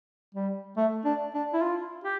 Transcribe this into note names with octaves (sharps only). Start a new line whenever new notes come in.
G3
A3
D4
D4
E4
F4
G4